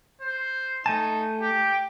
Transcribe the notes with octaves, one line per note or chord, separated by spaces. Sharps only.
C5
A3 D#4 G#5 A5
G4 G5